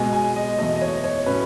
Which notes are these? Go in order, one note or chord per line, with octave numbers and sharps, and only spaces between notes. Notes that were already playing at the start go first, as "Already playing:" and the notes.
Already playing: B2 G#3 B3 G#5
G#5
D#5
E2 B2 A3 D#5
D#5
C#5
C#5
A2 F#3 C#4 B4